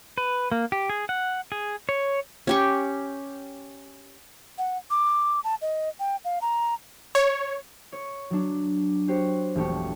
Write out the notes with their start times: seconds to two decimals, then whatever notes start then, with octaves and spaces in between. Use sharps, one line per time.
0.18 B4
0.52 A#3
0.72 G4
0.89 G#4
1.09 F#5
1.52 G#4
1.89 C#5
2.47 C#4 G4 C#6
4.58 F#5
4.90 D6
5.44 A5
5.62 D#5
6.00 G5
6.25 F5
6.42 A#5
7.15 C#5
7.92 C#5
8.31 F#3 D4
9.08 F#4 G4 C5 C#5
9.55 E1 A#1 A3 G4 C#6